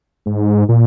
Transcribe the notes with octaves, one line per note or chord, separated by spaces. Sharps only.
G#2
A#2